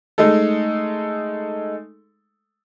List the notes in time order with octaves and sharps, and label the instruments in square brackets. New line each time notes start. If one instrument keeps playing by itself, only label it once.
[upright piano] G#3 A3 D#4 A4